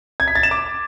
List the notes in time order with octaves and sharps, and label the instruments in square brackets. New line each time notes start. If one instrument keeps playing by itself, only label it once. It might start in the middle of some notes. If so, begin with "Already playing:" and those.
[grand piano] G#6
B6
A6
E7
D6